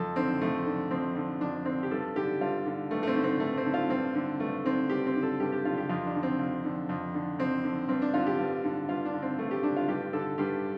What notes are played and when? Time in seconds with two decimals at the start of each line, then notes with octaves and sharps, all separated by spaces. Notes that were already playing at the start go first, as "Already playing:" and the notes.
Already playing: F2 A4
0.16 D3 C4
0.41 F2 A3
0.66 D3
0.91 F2 C4
1.16 D3
1.41 F2 D4
1.65 D3 C4
1.83 G4
1.91 G2 A4
2.15 D3 G4
2.41 G2 F4
2.66 D3
2.91 G2 A3
3.03 A3
3.07 C4
3.15 D3
3.24 C4
3.40 G2 A3
3.57 C4
3.65 D3
3.74 F4
3.90 G2 C4
4.15 D3
4.40 G2 A3
4.65 D3 C4
4.90 G2 G4
5.06 C4
5.15 D3
5.23 A4
5.40 G2 G4
5.52 G4
5.65 D3 F4
5.78 G4
5.89 F2 F4
6.06 D4
6.15 D3
6.23 C4
6.39 F2
6.65 D3
6.89 F2
7.14 D3
7.39 F2 C4
7.64 D3
7.88 G2 C4
8.02 D4
8.14 D3 F4
8.27 G4
8.39 G2
8.64 D3
8.89 G2 F4
9.05 D4
9.13 D3
9.22 C4
9.38 G2 A3
9.51 G4
9.63 D3 D4
9.76 F4
9.88 G2 G4
10.13 D3 A4
10.38 G2 G4